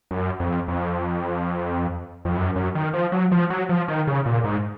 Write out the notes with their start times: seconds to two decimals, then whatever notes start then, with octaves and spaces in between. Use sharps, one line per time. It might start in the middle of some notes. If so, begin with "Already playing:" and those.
0.11 F#2
0.40 F2
0.68 F2
2.25 F2
2.37 F#2
2.56 F#2
2.75 D#3
2.93 F3
3.12 F#3
3.32 F3
3.50 F#3
3.69 F3
3.88 D#3
4.07 C#3
4.26 A#2
4.44 G#2